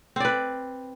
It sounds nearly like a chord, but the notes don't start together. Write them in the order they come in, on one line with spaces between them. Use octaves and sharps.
C4 D5 B4